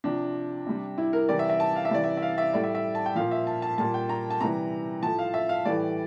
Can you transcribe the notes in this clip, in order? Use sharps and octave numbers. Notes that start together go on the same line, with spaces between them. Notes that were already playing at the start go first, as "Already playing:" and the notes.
C3 F3 D4
C3 G3
E4
A#4
C3 E3 G3 D5
E5
E5
A5
F5
E5
C3 E3 G3 D5
E5
E5
F5
E5
A2 G3 D5
E5
E5
A5
G5
A#2 F3 F5
E5
A5
A5
A#2 G3 A5
G5
A#5
A5
C3 E3 G3 A#5
A2 F3 A5
F5
E5
F5
A2 E3 G3 D5